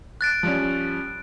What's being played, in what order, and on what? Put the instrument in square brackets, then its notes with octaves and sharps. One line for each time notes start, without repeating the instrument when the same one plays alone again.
[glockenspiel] F#6 A6 D7
[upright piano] F3 G3 C#4